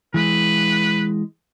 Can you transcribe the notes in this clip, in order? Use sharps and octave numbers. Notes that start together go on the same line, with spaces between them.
E3 G#3 B4